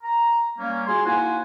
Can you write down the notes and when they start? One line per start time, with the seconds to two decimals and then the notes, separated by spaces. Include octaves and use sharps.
0.03 A#5
0.58 G3 A#3 C#4
0.86 F4 F#4 G#4 G#5 C6
1.03 A#3 D#4 E4 F#4 C5 G#5